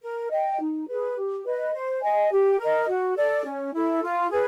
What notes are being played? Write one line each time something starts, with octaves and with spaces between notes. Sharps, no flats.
A#4
D#5 G5
D#4
G#4 B4
G4
B4 D#5
C5
D#5 G#5
G4
A#4 D#5
F#4
A4 D5
C#4
E4 A4
F4
G#4 B4